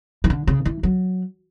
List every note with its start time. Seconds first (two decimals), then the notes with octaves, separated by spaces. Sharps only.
0.24 E3
0.30 D3
0.47 C#3
0.65 E3
0.83 F#3